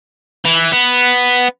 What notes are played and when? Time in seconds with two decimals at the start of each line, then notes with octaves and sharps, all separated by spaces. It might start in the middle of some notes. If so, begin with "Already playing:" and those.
0.45 E3
0.72 B3